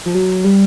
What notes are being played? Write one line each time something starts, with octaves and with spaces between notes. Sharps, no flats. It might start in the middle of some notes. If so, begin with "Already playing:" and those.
F3
F#3
G3